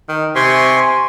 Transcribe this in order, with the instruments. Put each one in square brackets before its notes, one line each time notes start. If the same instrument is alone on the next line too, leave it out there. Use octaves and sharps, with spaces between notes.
[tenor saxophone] D#3
[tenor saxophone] C3 [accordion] G#5 C6 C#6